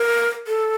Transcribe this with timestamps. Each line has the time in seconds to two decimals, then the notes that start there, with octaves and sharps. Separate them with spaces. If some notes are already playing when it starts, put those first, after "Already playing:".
Already playing: A#4
0.47 A4